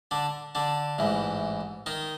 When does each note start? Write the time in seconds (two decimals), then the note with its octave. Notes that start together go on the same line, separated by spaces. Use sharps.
0.11 D3 D4
0.55 D3 D4
0.98 A1 G#2 E3
1.86 D#3 D#4